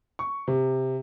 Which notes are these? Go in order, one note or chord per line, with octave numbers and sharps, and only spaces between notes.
C#6
C3